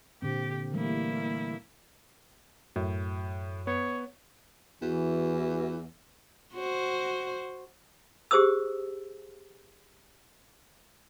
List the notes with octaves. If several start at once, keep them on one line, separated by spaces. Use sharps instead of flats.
A#2 D3 C4 G4
E3 G3 A3 A#3 E4
F#2 A2
B3 C#5
E2 E3 F#4
F#4 C5
G4 G#4 C5 D#6 E6